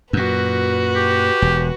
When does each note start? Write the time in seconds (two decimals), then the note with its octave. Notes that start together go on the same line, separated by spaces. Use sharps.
0.13 F#2 A#2 F#4 B4
0.95 G4
1.42 E1